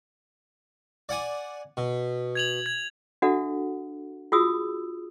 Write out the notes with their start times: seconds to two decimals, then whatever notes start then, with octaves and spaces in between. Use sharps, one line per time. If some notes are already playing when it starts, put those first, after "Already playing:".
1.09 D5 F#5 G#5
1.77 B2
2.35 G#6 F7 F#7
2.66 G#6
3.22 D4 F#4 A4 E5 F#5
4.32 F4 F#4 G#4 D#6 E6